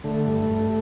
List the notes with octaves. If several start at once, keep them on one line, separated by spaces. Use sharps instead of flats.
D3 A3
G2
G2